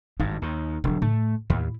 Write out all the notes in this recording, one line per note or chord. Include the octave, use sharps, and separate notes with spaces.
G#1 G2 D#4
D#2 D#3
E1 D3 F#3
A2 A3
D#2 A2 E4